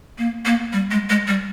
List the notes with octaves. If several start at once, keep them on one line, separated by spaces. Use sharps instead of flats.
A#3
A#3
G3
G#3
G#3
G3